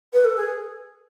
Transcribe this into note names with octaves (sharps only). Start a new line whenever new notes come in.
B4
A4
G#4